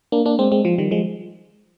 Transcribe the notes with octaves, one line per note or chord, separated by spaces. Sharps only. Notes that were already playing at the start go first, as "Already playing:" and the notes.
A#3 D4
A#3 D4
G#3 C4
G#3 C4
F3
D#3 G3
F3 G#3